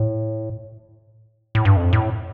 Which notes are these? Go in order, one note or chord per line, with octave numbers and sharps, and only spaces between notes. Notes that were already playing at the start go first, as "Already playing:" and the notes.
Already playing: A2
A2
G2
F2
A2